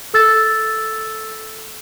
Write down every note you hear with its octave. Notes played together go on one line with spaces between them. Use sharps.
A4 E6 A6